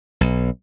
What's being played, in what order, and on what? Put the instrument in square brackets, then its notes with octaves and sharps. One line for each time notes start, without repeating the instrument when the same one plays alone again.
[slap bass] B1